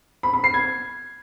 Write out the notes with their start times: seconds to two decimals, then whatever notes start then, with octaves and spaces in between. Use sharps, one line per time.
0.23 B5
0.34 B5
0.44 C7
0.54 G#6